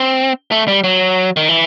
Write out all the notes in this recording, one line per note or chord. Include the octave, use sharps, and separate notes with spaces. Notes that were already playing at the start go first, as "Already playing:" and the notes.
Already playing: C4
A3
G3
F#3
D#3
E3